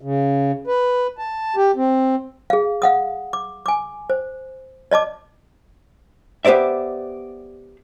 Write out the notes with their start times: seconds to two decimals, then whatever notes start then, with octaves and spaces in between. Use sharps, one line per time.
0.01 C#3
0.67 B4
1.18 A5
1.56 G4
1.76 C4
2.50 G#4 F5
2.82 F5 F#5 D#6
3.33 D6
3.66 G#5 D6
4.10 C5
4.91 D5 D#5 A5 D6
6.45 B3 G4 C5 D5 E5